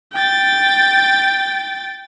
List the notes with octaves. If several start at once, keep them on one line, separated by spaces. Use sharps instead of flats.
G5 A6